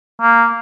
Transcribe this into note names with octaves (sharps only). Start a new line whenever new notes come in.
A#3